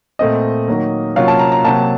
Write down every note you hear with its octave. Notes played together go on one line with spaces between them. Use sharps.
A#2 A3 C4 D#5
D#3 F#3 A#3
C3 F#3 A#3 C#4 F4 F5
A5
A#5
A#5
C3 F#3 A#3 A5